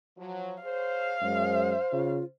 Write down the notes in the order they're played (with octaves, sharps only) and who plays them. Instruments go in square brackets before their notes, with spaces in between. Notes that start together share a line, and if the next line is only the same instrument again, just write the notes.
[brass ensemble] F3 F#3
[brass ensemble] G#4 C5 C#5 [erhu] F5
[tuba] F#2 [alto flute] G#3 [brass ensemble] C5
[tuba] C#3 [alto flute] F4